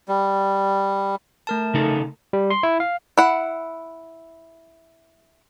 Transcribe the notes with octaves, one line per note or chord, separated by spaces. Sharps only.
G3
A3 A#4 A5
C#3 D#4 A4
G3
C6
E4
F5
E4 F#5